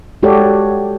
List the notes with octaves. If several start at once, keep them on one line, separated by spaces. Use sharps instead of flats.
G#3 F#4 G4 A4 C#5 D5